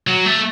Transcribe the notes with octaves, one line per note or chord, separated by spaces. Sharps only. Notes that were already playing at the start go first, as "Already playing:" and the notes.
F#3
A3